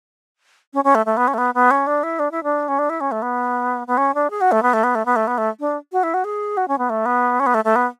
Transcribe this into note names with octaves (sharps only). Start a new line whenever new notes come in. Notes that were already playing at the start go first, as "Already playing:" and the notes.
C#4
C#4
A3
A3
B3
C#4
A3
B3
B3
C#4
D4
E4
D4
E4
D4
C#4
D4
E4
C#4
A3
B3
B3
C#4
D4
G#4
F#4
A3
B3
A3
B3
A3
B3
A3
B3
A3
D4
F#4
E4
F#4
G#4
F#4
C#4
B3
A3
B3
C#4
B3
A3
A3
B3